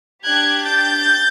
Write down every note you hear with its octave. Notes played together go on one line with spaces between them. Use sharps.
D4 G4 F#6 G#6
G6 A6